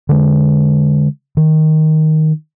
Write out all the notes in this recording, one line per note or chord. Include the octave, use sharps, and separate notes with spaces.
D3 G#3
D#3